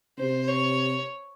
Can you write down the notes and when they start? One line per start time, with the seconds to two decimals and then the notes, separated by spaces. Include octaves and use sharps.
0.19 C3 C5
0.48 C#5